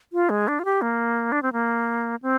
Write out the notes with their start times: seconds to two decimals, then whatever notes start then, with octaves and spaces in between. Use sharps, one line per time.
0.13 F4
0.30 G#3
0.48 D4
0.59 F4
0.65 G4
0.82 A#3
1.32 D4
1.43 C4
1.53 A#3
2.22 C4